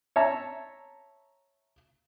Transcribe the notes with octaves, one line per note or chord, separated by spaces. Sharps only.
C#5 E5 A5 A#5